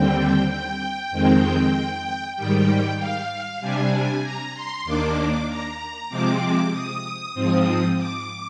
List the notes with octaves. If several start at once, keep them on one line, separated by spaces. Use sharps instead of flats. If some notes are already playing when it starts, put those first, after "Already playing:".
Already playing: D#2 D3 G3 C4 G5
G5
F2 D#3 G#3 C4 G5
G#2 D#3 G3 G5
F5
C3 G3 D4 G#5
A#5
C6
D#2 D#3 A#3 D4 D6
A#5
C3 F3 G#3 C4 D6
D#6
G#2 F3 C4
D6